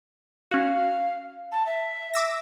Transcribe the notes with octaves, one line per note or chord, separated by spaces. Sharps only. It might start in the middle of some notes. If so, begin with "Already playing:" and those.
C#4 F#4 F5
A5
E5
D6 E6 A#6